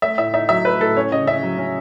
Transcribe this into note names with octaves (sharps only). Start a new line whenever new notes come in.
A3 E5
A2 E5
D#4 E5
F#3 E5
A3 B4
A2 A4
C#4 C#5
C#3 D#5
C#3 E5
F#3
C#4